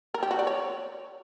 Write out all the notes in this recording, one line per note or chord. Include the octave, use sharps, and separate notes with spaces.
A#4
G4
F#4
D5
C#5